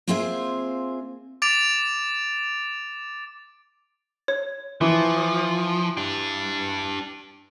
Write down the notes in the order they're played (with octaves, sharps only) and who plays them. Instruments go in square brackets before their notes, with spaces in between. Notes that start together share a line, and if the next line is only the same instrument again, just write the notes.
[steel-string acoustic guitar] A#3 C4 F4 G#4 C5 E5
[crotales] D6 A6 D7 F7
[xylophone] C#5
[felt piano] E3 [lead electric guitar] F3
[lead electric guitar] D4 G4